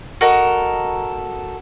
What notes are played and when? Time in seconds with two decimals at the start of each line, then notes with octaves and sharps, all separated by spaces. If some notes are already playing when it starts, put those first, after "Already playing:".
0.21 F#4 A4 A#4 D#5